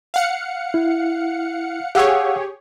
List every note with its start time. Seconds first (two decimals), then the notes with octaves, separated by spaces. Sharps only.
0.14 F5 F#5 C#7
0.74 E4
1.95 G4 G#4 C#5 F5 F#5 E6